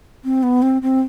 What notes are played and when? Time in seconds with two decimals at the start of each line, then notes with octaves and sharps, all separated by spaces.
0.25 C4
0.43 B3
0.62 C4
0.82 C4